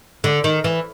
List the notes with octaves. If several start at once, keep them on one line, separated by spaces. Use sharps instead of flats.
D3
D#3
E3